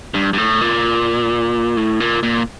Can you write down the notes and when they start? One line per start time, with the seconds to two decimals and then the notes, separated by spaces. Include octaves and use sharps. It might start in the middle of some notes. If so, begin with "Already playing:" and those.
0.14 G2
0.33 G2
0.38 A2
0.61 A#2
1.77 A2
2.00 A#2
2.23 A#2